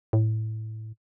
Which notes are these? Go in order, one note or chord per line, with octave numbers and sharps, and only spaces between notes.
A2